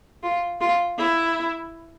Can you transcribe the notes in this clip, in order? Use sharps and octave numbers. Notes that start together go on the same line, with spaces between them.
F4
F4
E4